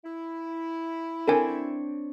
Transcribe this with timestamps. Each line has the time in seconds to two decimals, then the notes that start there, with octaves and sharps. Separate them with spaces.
0.04 E4
1.28 C4 D4 A4 A#4 C#5 G#5